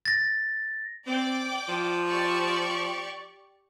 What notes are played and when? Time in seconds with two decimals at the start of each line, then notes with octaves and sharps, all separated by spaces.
0.06 A6 A#6
1.07 C4 D5 G5 D6
1.68 F3
2.08 G4 D5 C#6